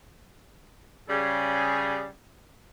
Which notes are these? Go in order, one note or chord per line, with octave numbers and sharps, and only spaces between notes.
C#3 G3 G#4